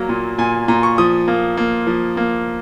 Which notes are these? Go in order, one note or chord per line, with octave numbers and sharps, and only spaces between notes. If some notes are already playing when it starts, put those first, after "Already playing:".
Already playing: F#3 A#3 A#5
A#2
A#2 G#5
A#2 A#5
C#6
F3 D#6
A#3
A#3
F3
A#3